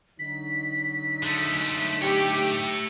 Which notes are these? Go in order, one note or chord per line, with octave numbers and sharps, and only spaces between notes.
D3 F#3 D#4 B6
G#3 A3
A3 G4 C#5